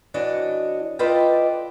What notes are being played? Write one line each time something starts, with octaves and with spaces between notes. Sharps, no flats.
E3 D4 F#4 C#5 D#5
F4 A4 B4 D5 D#5 G5